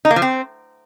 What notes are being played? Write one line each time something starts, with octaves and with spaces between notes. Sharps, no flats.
D#4
A#3
F3
C4